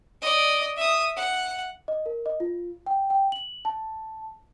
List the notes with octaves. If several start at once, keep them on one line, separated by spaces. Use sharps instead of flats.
D5 D#5
E5 D#6
F#5
D#5
A#4
D#5
F4
G5
G5
F#7
A5